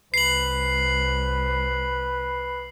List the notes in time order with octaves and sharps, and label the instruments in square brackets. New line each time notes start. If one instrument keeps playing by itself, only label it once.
[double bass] C2 [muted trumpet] B4 [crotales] C7 F#7